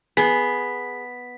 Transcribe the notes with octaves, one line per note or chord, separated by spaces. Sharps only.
B3 G#4 B6